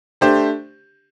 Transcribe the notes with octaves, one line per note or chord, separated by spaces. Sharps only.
A3 D4 G4 C5